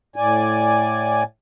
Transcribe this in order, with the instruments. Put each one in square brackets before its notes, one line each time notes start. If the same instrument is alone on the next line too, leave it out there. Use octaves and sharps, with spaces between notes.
[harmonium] A2 D5 G#5